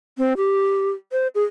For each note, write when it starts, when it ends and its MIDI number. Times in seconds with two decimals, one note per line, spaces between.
0.18 0.33 60
0.37 0.90 67
1.12 1.28 72
1.35 1.43 68